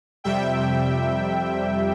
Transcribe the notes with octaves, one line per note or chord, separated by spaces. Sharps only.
F2 C3 G3 E5 G5